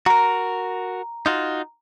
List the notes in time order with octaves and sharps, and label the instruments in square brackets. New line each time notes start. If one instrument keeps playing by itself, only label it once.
[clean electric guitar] F#4 A#4 [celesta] A#5
[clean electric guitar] D#4 F4 F#4